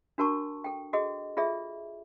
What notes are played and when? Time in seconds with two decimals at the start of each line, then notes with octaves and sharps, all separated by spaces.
0.18 D4 F#4 A#4 A5 C#6
0.64 A4 G5
0.93 F#4 G#4 A4 D#5
1.37 F4 G#4 A4 D5 E5